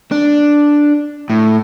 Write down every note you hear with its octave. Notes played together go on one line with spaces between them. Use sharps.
D4
A2